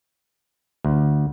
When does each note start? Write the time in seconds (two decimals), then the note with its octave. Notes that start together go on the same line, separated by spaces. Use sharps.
0.84 D2